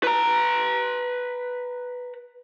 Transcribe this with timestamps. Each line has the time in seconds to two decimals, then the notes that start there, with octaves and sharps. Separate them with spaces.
0.03 B4 A#5